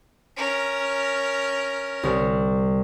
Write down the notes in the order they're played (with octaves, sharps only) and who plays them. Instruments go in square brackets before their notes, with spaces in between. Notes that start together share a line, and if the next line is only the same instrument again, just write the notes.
[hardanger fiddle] C#4 A#4
[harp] C2